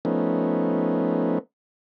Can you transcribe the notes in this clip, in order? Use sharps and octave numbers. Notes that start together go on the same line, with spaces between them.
F3 A3 B3 C#4 D#4